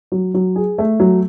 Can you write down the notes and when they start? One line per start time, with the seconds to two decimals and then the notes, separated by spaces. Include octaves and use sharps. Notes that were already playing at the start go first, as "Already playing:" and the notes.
0.12 F#3
0.34 F#3
0.56 G#4
0.78 A3
1.00 F#3